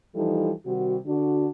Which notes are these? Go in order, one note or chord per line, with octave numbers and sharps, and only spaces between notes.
E3 F3 G3 D#4 E4 A4
C3 D#3 G3 F#4
D3 D4 F#4